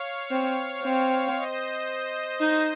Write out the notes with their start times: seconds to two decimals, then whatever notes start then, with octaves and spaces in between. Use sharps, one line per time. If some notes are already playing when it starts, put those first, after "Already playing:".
Already playing: C#5 F5
0.31 C4
0.83 C4
1.36 C5 D#5
2.40 D#4